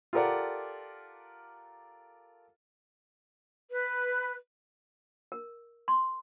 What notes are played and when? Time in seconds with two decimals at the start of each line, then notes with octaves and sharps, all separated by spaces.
0.13 F4 G4 A4 A#4 D5 F#5
3.70 B4
5.32 A#4
5.88 C6